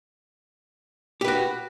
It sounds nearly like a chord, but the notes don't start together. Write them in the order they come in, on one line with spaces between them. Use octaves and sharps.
G4 B4 F#4